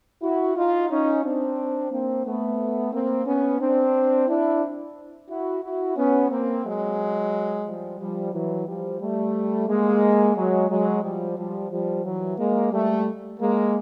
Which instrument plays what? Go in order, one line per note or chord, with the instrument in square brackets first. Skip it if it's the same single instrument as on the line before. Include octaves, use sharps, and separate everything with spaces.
[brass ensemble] E4 F#4
D#4 F4
C#4 D#4
C4 D4
A#3 C4
A3 B3
A#3 C4
B3 C#4
C4 D4
D4 E4
E4 F#4
E4 F#4
B3 C#4
A#3 C4
F#3 G#3
F3 G3
F3 G3
E3 F#3
F3 G3
G3 A3
G#3 A#3
F#3 G#3
F#3 G#3
F3 G3
F3 G3
F3 G3
E3 F#3
G#3 A#3
G3 A3
G#3 A#3